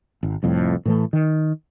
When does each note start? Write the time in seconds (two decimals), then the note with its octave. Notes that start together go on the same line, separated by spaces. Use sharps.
0.23 G#1
0.43 C2 F2 A2
0.86 A2 E3 A3
1.13 D#3